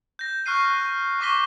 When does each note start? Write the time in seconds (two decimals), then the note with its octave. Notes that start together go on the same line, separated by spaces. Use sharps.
0.19 G6 A#6
0.46 C#6 F6 F#6 C7 D#7
1.20 C#6 D6 A#6 B6 D#7 G7